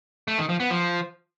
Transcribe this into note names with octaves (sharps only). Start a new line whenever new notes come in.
A3
D#3
F3
B3
F3